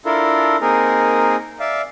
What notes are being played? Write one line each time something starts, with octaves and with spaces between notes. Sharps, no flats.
D4 E4 F4 A4 A#4
A#3 C4 D#4 G#4 A#4
D5 E5 F5